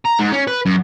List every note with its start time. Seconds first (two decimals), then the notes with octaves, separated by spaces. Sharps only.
0.05 A#5
0.19 G#2
0.32 C#4
0.48 B4
0.66 F#2